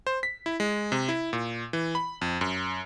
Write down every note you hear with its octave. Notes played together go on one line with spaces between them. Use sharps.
C5
B6
E4
G#3
C3
E4
A#2
E3
B5
F2
F#2